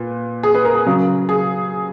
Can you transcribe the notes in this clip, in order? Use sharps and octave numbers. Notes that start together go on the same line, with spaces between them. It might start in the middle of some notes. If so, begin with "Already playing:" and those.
Already playing: A#2 B4
G#4
B4
A#4
G#4
C#3 F#3
G#4